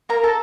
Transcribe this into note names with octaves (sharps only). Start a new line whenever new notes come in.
A#3 A#4 A#5
A4 A5